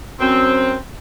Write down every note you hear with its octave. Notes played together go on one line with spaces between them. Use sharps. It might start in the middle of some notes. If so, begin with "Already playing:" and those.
F#2 C4